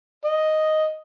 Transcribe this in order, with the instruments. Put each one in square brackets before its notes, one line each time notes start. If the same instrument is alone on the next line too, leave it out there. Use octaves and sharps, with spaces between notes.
[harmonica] D#5